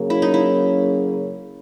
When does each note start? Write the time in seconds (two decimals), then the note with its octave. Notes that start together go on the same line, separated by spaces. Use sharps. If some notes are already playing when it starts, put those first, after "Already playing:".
Already playing: C#3 F#3 A#3
0.10 E4
0.22 D#4
0.34 E4